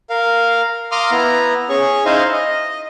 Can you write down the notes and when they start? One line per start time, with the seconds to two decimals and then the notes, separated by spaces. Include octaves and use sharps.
0.10 A#4 F5
0.92 F5 A#5 C6 D6 D#6 F6
1.11 B3 E4 A#5
1.69 C#4 G#4 C#5 C#6
2.05 D#4 E4 C5 D#5 F5
2.34 D#5